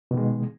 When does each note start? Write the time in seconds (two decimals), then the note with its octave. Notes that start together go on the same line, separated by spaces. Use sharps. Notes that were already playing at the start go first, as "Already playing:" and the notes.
0.11 B2
0.14 D#3
0.17 G#3